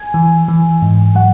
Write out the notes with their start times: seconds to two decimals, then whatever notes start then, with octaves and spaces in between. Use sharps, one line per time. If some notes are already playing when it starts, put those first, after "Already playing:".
Already playing: G#5
0.14 E3
0.48 E3
0.82 G#2
1.15 F#3 F#5